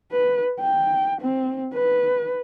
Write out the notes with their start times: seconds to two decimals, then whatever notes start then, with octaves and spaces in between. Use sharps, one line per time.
0.12 B4
0.60 G5
1.21 C4
1.74 B4